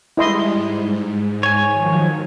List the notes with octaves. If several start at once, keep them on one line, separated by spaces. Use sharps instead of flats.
G3 G#3 E4 D#5 C6
G#2
C#5 G#5
D#3 F3 F#3